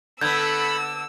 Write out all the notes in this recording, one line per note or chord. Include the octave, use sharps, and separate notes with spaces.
D3 B3 A4 B5 E6 G6 G#6